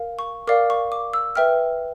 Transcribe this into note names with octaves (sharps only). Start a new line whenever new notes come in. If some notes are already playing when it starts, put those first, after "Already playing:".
Already playing: A#4 F5
C#6
A#4 D5 F5 D6
C#6
D6
E6
B4 E5 G5 F6